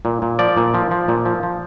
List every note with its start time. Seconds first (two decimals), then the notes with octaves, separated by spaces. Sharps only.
0.05 A#2
0.22 A#2
0.39 F3 D5
0.57 A#2
0.74 F3
0.91 F3
1.08 A#2
1.25 F3
1.43 F3